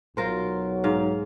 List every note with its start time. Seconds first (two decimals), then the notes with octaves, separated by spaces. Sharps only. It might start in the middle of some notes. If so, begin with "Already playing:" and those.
0.17 B1 F#3 F4 A#4 C5
0.84 G#2 F5